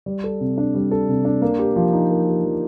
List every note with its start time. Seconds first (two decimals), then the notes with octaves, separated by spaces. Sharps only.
0.06 G3
0.24 A4
0.41 C3
0.58 D4
0.75 G3
0.91 A4
1.09 C3
1.25 D4
1.42 A#3
1.59 G4
1.76 F3
1.93 D#4
2.10 A#3
2.27 G4
2.45 F3